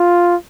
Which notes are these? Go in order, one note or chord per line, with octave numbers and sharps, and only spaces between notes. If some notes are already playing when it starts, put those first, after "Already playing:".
Already playing: F4